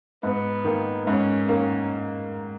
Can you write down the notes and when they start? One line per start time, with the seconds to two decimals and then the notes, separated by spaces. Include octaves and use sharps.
0.23 G#2 B3
0.64 D#3 A#3
1.07 G#2 C#4
1.48 D#3 A#3 C#4